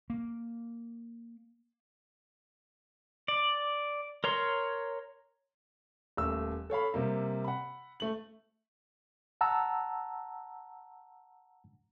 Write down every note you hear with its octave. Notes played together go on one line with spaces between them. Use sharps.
A#3
D5
A#4 C#5 A#5 C6
D#1 A3 E6
A4 C#5 F5 B5
C3 G3 A#3
F#5 B5
A3 F#7
F#5 A5 A#5 E6